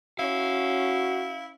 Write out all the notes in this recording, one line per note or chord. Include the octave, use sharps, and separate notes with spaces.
C#4 E4 F#4 F5